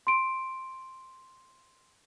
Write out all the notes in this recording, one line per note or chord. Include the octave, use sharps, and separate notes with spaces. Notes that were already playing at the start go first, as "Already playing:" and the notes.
C6 D7